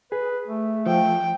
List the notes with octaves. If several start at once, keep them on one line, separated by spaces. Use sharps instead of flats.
G#4 B4
A3
F3 G5